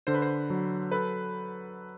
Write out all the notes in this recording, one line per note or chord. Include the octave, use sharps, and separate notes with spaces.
D3 C5
B4
C5
F#3
A4 B4